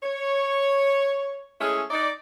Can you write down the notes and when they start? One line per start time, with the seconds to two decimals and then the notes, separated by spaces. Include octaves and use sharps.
0.03 C#5
1.61 G#3 A3 C#4 E4 G#4
1.91 D#4 D5